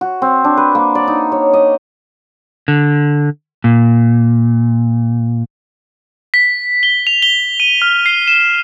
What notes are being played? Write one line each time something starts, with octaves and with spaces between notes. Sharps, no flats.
F#4
C4
D4
B4
A#3
D5
D#4
C#5
D#5
D3
A#2
B6
G7
F7
G7
D#7
F6
C7
E7